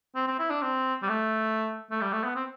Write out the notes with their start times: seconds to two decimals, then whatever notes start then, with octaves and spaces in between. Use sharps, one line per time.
0.15 C4
0.27 C4
0.39 E4
0.50 D4
0.62 C4
1.03 G3
1.09 A3
1.91 A3
2.01 G3
2.13 A3
2.24 B3
2.36 C4